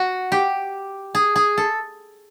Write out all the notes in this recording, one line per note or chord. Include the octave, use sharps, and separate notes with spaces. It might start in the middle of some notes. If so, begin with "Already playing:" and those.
Already playing: F#4
G4
G#4
G#4
A4